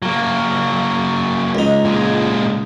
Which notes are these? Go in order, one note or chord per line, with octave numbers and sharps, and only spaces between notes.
F#3 A#3
C#2 D#4
A#2 G#3